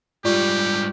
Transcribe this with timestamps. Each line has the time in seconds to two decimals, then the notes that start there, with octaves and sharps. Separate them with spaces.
0.25 G#2 G3 F4 G4 D5 C#6